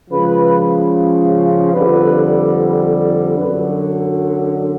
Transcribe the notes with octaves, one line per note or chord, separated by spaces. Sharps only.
C#2 C#3 F3 B4
F2 D3 G3 B4
F#2 D3 F#3 B4